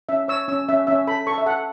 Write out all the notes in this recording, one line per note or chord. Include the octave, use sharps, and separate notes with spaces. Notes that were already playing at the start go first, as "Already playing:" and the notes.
C#4 E5
C#5 E6
C#4 E6
C#4 E5
C#4 E5
A4 B5
A4 C#6
E5
A4 F#5